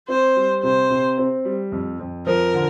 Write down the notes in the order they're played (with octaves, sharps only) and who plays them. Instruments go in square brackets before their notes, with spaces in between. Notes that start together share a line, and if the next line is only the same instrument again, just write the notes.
[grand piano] C4 [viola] C5
[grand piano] G3
[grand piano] C3 [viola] C5
[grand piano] C3
C4
G3
F2
F2
[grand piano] F3 [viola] A#4
[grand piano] D3